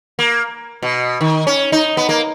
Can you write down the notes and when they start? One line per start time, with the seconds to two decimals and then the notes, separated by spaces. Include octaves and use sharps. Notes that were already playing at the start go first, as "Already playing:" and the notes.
0.19 A#3
0.83 B2
1.21 D#3
1.47 C#4
1.72 D#4
1.97 B3
2.09 A#3